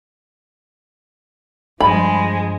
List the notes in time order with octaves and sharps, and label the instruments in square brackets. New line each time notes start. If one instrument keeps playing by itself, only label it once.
[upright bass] G2 [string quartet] F3 G#3 [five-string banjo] B5